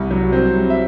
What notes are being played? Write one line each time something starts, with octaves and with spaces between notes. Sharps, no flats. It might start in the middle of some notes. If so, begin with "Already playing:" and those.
Already playing: C2 G3
F#3
C4
G3
E5